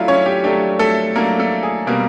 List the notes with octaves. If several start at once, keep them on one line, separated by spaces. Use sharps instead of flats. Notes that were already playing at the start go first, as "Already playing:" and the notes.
Already playing: F#3 A3 D4 E4 F4 F5
C#4 C#5
G4
F#3 A3 D4 G4
A3 A4
F#3 A3 A#3 D4 A#4
A3 A4
G#4
B2 G3 A#3 C4 A#4